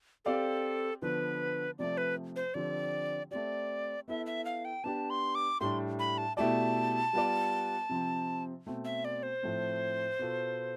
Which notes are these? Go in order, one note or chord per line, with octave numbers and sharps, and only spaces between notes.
C4 G4 A4 D5 F5
D3 F3 B3 B4
C3 F3 A3 D5
B4
C5
D3 F3 C4 G4 D5
A3 C4 G4 D5
B3 E4 A4 E5
E5
F5
G5
B3 D4 G4 A5
C6
D6
A2 G3 D4 C6
B5
A5
B2 A3 E4 G4 D5 A5
G3 B3 F4 B4 D5
C3 F3 C4
B2 A3 C4
E5
D5
C5
A2 F3 A3 C4
B2 B3 F4 A4